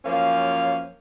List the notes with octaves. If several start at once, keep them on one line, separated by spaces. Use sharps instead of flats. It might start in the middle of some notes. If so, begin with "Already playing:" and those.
F#2 F3 A#3 C#4 C#5 F5